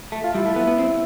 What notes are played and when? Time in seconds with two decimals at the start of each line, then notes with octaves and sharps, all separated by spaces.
0.12 A3
0.24 F4
0.34 G3 E4
0.46 A3
0.56 B3
0.67 B3
0.78 C4